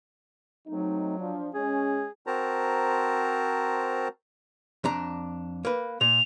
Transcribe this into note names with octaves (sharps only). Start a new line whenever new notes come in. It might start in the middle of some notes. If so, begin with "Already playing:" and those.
F#3 A3 C4 D#4
F3 D4
G#3 C#4 G#4
C4 F#4 A#4 C5 A5 A#5
F2 D4 A#5
A#3 B4
A#2 F7